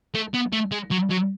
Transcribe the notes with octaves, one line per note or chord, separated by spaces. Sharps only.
A3
B3
A3
G#3
F#3
F#3